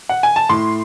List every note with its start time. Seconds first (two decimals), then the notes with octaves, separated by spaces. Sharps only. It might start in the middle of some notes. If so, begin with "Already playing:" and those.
0.09 F#5
0.23 G#5
0.36 A5
0.49 A2 C6